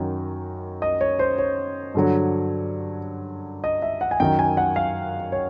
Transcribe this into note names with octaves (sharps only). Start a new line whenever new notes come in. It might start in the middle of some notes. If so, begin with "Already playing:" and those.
Already playing: F#2 D#3 F#3
D#5
C#5
C5
C#5
G2 D3 F#3
D#5
E5
F#5
G#5
F#2 D#3 F#3 G5
G#5
F#5
F5
C#5